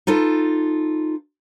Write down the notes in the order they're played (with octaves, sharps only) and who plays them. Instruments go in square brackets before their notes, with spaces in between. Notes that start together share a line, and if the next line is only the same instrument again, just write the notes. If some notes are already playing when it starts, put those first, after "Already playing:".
[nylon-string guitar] D#4 F4 A4 B4